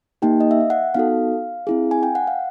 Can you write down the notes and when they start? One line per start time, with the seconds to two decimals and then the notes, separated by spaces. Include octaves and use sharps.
0.22 A#3 D#4 G4 G5
0.40 D#5
0.51 E5
0.61 F5
0.70 F#5
0.94 B3 D#4 F#4 A4 F5
1.67 C4 E4 G#4
1.91 G#5
2.03 G5
2.15 F#5
2.27 F5